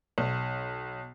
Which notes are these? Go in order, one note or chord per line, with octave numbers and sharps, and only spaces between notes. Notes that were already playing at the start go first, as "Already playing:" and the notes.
B1